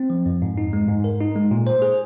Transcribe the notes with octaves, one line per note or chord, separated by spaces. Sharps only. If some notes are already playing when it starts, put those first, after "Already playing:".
Already playing: C4
F3
F2
G#2
D#4
G#3
G#2
A#4
D#4
G#3
A#2
C5
G#4